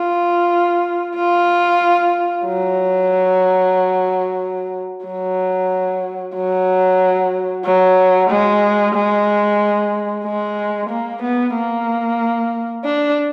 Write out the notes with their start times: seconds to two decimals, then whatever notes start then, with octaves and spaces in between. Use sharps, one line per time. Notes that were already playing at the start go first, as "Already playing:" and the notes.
Already playing: F4
1.16 F4
2.46 F#3
5.05 F#3
6.35 F#3
7.65 F#3
8.30 G#3
8.95 G#3
10.25 G#3
10.90 A#3
11.22 B3
11.55 A#3
12.85 D4